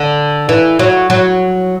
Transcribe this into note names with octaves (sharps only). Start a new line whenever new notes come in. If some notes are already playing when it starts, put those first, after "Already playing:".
Already playing: D3
E3
F#3
F#3